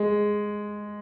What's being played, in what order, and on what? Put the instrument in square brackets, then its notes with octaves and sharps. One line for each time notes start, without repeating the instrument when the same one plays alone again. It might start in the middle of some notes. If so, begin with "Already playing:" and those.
Already playing: [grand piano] G#3